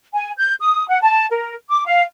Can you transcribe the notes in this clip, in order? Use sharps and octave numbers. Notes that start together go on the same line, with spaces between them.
G#5
G6
D#6
F#5
A5
A#4
D6
F5